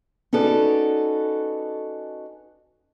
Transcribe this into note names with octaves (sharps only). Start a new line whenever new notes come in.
C#4 D#4 F#4 A4 B4 D5